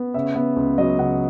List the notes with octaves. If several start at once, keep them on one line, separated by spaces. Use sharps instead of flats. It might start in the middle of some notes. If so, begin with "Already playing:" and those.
Already playing: B3
C#3 E5
B3
C#2
F#3 D#5
C#3 F#5